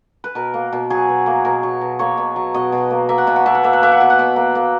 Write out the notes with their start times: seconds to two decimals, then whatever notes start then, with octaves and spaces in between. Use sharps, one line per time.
0.24 B4
0.35 B2 A#4
0.54 A#3
0.73 B2
0.90 F#3 G#4
1.09 B2
1.26 A#3
1.45 B2 A#4
1.63 F#3
1.81 B2
1.99 A#3 C#5
2.18 B2
2.36 F#3
2.54 B2 D#5
2.72 B2
2.90 A#3
3.09 A#3 E5
3.18 F#5
3.27 B2 E5
3.36 F#5
3.46 B2 E5
3.55 F#5
3.63 A#3 E5
3.73 F#5
3.82 A#3 E5
3.92 F#5
4.00 B2 E5
4.10 F#5
4.19 B2 E5
4.36 A#3
4.55 A#3